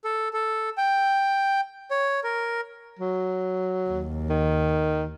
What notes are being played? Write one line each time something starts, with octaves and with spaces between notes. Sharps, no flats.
A4
A4
G5
C#5
A#4
F#3
D#2
D#3